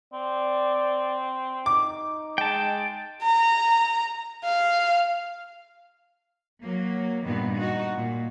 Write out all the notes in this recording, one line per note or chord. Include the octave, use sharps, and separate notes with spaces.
C4 D5
D#4 D6
G#3 G5 A5
A#5
F5
F#3 A#3
G2 A#2 D#3 B3
D#4 F#4
A#2